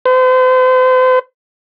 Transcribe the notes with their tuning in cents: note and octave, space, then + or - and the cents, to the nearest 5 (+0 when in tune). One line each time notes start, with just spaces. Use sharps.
C5 -40